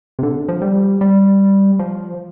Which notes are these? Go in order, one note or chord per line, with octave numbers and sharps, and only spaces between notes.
C3
D3
F3
G3
G3
F3